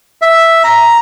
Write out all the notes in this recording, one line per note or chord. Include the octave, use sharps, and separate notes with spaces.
E5
A#5